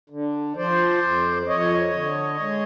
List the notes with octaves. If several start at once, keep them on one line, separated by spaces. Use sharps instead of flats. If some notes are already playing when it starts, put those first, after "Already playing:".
D3
F3 C5 D5
F2
F2 C#5 D#5
D3
G#3